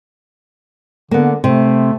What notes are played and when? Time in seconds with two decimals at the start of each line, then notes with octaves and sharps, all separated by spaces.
1.11 D3 A#3 B3
1.44 C3 A3